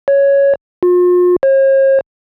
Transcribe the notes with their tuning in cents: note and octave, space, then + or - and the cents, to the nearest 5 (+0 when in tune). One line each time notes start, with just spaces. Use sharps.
C#5 +5
F4 +40
C#5 -45